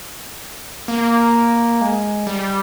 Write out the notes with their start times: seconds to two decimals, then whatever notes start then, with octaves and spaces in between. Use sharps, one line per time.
0.88 A#3
1.81 G#3
2.27 G3